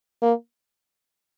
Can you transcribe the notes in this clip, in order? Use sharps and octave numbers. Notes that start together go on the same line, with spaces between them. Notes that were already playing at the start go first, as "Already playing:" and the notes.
A#3